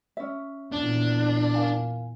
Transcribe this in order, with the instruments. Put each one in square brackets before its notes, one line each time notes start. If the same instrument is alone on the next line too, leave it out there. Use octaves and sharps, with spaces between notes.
[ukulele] C#4 E5
[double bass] E2 A#2 [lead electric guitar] D4
[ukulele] A#4 F5 G#5